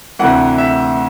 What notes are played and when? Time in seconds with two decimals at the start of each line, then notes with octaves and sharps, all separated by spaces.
0.19 D2 C3 E3 F#5
0.58 E5